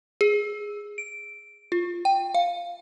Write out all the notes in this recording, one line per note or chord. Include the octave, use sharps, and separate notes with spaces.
G#4
D7
F4
G5
F5